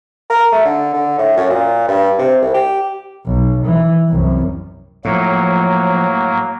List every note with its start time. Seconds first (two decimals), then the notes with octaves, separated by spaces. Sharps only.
0.30 A#4
0.52 A3
0.65 D3
0.93 D3
1.18 A2
1.37 F#2
1.50 A#2
1.88 G2
2.19 C3
2.42 C2
2.54 G4
3.27 B1
3.65 E3
4.09 C2 F#2
5.05 A2 F3 F#3 A#3